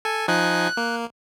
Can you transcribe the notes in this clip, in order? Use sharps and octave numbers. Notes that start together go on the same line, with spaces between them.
A4 G#5
F3 D#4 G#5 F#6
A#3